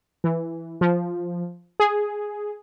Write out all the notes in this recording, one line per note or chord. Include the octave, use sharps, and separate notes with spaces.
E3
F3
G#4